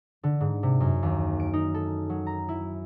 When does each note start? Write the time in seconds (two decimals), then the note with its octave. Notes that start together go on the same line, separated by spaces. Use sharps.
0.23 D3
0.40 G#2
0.63 C3
0.80 F#2
1.03 D#2
1.40 D7
1.53 D#4
1.74 A4
2.09 F#3
2.27 A#5
2.49 E4